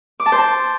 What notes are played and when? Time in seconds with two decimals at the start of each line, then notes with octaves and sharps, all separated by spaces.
0.20 D6
0.26 A5
0.32 C5
0.38 A5